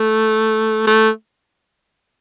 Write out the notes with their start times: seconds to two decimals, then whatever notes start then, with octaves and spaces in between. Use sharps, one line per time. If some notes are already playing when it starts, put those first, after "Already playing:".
Already playing: A3
0.87 A3